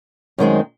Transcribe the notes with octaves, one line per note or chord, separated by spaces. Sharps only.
F#2 D#3 G#3 C4